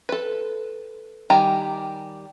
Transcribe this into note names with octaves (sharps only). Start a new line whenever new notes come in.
A4 B4
D#3 G3 G4 G#5 A#5